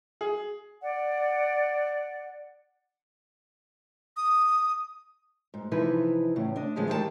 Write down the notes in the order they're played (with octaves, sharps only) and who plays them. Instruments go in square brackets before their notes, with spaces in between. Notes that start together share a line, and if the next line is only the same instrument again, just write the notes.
[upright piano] G#4
[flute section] D5 F#5
[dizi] D#6
[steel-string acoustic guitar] G#2
C3 E3 F3 D#4 E4 B4
E2 A2 C#3
D4 D#5
A2 D3 F3 G#3 B3
D#3 E3 G4 D5 A5